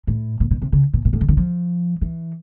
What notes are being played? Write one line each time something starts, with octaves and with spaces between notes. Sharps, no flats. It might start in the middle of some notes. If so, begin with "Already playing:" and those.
A2
A#2
B2
C3
C#3
A#2
A#2
A2
D3
D#3
F3
E3